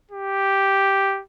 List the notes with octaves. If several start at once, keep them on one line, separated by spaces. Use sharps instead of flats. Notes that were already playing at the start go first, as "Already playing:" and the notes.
G4